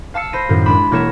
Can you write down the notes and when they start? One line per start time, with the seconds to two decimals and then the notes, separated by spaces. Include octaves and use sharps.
0.14 F5 A5 E6 C#7
0.33 C5 B5 A#6 C7 D#7
0.49 F#2 A2 D#3
0.66 G#3 D4 B5 E7
0.91 E1 A#3 E4 C#5 F#5 E7